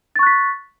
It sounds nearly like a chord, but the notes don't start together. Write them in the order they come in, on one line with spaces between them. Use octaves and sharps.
A6 C#6 F#6 B6